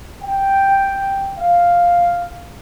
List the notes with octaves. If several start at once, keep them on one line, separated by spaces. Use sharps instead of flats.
G5
F5